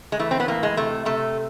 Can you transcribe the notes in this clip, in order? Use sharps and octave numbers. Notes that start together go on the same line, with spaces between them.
G#3
E3 A3
C4
B3
A2 A#3
G#3
C3 A3
C3 A3